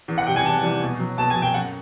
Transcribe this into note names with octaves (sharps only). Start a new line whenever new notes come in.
E2
F#5
C3 E3 G3 G5
G#5
E2 A5
C3 E3 G3
B2
F#3
B2 A5
G#5
F#3
G5
F#2 F#5